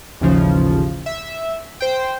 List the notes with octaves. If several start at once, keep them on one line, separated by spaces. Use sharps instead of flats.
A1 D#2 C#3 F3
E5
C5 G5